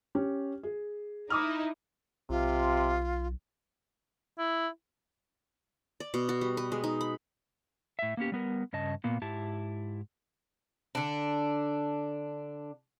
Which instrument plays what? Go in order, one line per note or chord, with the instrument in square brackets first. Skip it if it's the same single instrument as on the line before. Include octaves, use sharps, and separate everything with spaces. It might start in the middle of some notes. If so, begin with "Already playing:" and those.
[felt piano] C#4 G4
G#4
[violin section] D#4 E4 [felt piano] D6 D#6 F6
[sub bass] B1 [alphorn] C3 [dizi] F4
[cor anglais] E4
[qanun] D5
B2
F#4
G3
B4
G#3
D#4
B5
[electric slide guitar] A2 E5
A#3 B3 C#4 G4
G3 B3 A#4
G2 C#3 D#5 A5
A#2 A#3 B3
G#2 E4 G4 A5
[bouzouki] D3 D4